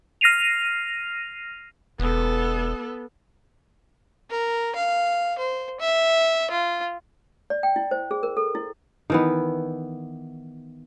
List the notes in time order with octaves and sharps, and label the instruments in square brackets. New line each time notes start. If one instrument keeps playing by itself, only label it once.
[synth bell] F6 A#6 C7 D#7 F7
[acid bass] E1 [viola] B3 A4
[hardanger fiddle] A#4
F5
C5
E5
F4
[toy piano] D5
G5
E4
C5
G#4
A#4
A4
E4
[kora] D#3 E3 B3